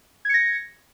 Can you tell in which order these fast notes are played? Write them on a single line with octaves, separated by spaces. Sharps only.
G#6 C#7 A#6